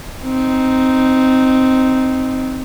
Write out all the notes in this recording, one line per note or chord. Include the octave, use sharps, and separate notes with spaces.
C4 D#4